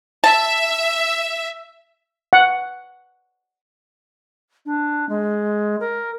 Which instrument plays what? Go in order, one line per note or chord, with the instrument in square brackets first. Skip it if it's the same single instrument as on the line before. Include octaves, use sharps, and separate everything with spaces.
[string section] E5 [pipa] A5
[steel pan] F#5
[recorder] D4
G#3
A#4